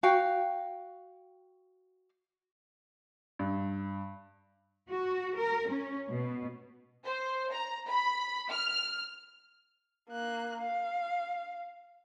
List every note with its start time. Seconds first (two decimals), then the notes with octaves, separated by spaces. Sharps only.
0.03 F#4 F5 G5
3.39 G2
4.90 F#4
5.38 A#4
5.68 C#4
6.09 B2
7.04 C5
7.52 A#5
7.89 B5
8.52 F6
10.09 A#3 F#6
10.61 F5